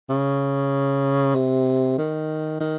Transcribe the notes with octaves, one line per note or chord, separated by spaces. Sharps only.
C#3
C3
D#3
D#3